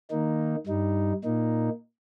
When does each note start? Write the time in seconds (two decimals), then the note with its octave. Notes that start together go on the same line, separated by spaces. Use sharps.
0.10 D#3 A#3 D#4
0.67 G2 G3 D#4
1.24 A#2 A#3 D#4